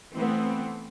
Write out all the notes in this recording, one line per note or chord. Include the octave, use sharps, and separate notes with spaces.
E3 A3 B3 C4